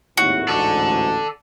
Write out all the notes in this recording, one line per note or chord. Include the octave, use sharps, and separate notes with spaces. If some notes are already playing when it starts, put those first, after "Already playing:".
G#1 D#2 A2 F#4
A1 D2 G#2 A4 D5